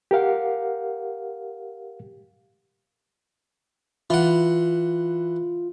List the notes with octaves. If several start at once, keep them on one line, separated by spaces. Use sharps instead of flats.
G4 A#4 F5 F#5
E3 F4 F#5